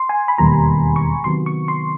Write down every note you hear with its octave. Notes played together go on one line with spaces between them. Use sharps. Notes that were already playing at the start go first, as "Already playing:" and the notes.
Already playing: C6
G#5
B5
E1 D#2 D#3 G3 B3 A#5
C#6
C3 D#3 F#3 B3 C6
C#6
C6